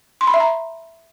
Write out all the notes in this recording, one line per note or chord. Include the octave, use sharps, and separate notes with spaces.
C6
B5
E5
A#5